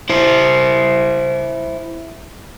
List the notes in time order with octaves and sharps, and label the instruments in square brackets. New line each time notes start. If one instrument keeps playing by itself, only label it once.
[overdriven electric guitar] E4 C5